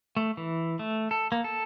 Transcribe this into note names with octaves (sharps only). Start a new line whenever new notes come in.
A3
E3
A3
A4
A#3
A4